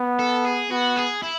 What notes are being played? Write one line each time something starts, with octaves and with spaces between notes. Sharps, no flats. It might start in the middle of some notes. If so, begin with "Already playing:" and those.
Already playing: B3
A4
G#4
B3 F#4
G#4
E4